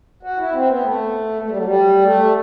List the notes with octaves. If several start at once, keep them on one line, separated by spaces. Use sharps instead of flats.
F#4
E4
C4
B3
A3
A3
G3
F#3
G3
A3